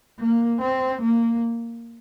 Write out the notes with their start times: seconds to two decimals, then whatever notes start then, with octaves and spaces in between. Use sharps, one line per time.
0.20 A#3
0.61 C4
1.01 A#3